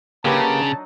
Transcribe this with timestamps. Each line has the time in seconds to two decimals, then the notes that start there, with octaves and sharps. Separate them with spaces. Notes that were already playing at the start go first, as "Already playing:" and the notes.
0.25 C#3 F#3 A#3 D4 D#4 G4 B4 A5